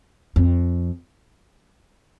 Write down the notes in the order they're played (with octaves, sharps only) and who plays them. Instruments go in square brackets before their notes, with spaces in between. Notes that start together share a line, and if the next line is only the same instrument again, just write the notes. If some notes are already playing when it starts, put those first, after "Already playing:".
[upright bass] F2